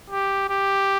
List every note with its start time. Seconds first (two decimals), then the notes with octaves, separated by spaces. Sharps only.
0.10 G4
0.49 G4